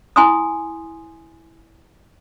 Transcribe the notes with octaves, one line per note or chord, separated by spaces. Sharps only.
E4 G#5 C6 D#6